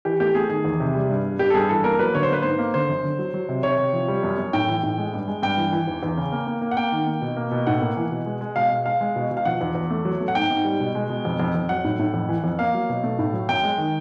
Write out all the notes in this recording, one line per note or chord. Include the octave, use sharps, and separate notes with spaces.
E3 G4
A3 G4
A3 G#4
D#3 G#4
E2
C3
G3
G2
G3
G2 G4
A4
G2 G#4
E3 A4
A#3 A#4
F#3 B4
D3 C#5
C5
A#3 B4
G#2 C5
A#3
D3 C5
F#2
D3
F#3
F#3
C3
C3 C#5
C3
F3
G3
F#2
F#2
A2 G5
E3
A2
G#3
G2
G#3
G2 G5
E3
E3
E2
E2
C#3
A#3
A#3
A#3
F#5
A#3 G5
D#3
A#3
B2
A#3
B2
A2 F#5
A#3
E3
B2
G#3
G#3
B2 F5
G#3
G#3 F5
G#3
B2
B2
F5
F3 F#5
E2
E2
A3
F#3
A3
F#5
G#2 G5
G#2
G3
B2
G#3
B2
F2
F2
F2
F#3 F#5
A2
A2
F2
E3
F2
A#3 F5
F#3
B2
A3
A2
F#3
F#2 G5
G#3
D#3